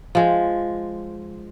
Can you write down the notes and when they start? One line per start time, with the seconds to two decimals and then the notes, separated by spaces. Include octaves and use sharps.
0.15 F3 G#3